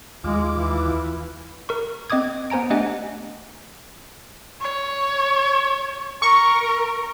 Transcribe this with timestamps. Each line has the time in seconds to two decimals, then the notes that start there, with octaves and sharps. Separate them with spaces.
0.24 D#2 G#3 F4 D6
0.59 E3
1.69 A#4 C#6
2.10 C4 D#5 D6 D#6 G#6
2.50 B3 C5 G#5 A#5 D7
2.70 A3 D4 G4 D#5 F#5 G#5
4.61 C#5
6.22 A#4 C#6